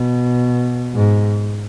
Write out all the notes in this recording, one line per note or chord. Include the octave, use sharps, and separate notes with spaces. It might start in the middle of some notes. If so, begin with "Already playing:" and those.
Already playing: B2
G#2